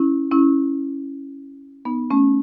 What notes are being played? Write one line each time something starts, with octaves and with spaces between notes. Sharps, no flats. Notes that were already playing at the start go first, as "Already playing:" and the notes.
Already playing: C#4 E4
C#4 E4
B3 D#4
A3 C#4